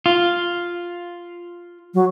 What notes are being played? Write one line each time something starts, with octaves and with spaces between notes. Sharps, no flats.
F4
F#3